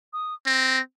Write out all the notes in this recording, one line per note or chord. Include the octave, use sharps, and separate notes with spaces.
D#6
C4 A#6